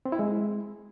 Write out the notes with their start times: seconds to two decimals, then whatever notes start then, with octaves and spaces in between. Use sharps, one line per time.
0.05 C4
0.12 E4
0.19 G#3